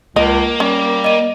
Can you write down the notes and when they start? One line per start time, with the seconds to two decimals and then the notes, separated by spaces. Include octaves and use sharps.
0.16 C#2 A#3 D#5
0.60 G3 C#4
1.04 D#5 D#7